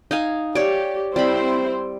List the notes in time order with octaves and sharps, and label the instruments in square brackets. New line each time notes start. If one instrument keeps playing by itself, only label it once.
[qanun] D#4 F5 G#5
[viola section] G4 [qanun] C#5 D5
[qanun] G3 B5 [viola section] C4 E4 C5